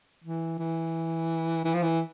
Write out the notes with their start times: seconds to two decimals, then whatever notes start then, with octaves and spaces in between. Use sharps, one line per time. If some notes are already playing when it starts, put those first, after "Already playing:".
0.24 E3
0.59 E3
1.65 E3
1.74 F3
1.83 E3